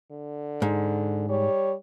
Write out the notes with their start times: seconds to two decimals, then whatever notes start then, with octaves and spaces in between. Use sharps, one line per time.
0.12 D3
0.62 G#2
1.29 G3 C#5